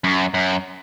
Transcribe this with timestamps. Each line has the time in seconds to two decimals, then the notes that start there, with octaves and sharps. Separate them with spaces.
0.04 F#2
0.34 F#2